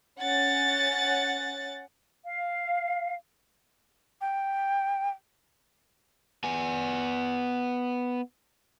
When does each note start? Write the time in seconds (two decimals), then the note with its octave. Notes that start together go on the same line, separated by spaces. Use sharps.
0.20 C#4 F#5 A6
2.25 F5
4.21 G5
6.44 B3 G#5